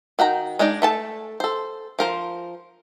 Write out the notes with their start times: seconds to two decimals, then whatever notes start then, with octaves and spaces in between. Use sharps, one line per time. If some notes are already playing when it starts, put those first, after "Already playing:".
0.19 D#3 F#4 G5 A#5
0.59 G#3 D4 D#4 D5
0.82 A3 A4 A5
1.40 A4 C5
1.99 F3 A#4 C5